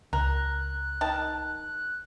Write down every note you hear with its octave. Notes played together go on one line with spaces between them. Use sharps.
C#2 A#4 F#6
D#3 A5